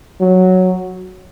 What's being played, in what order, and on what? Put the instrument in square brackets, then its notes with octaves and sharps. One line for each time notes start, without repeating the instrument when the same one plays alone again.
[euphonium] F#3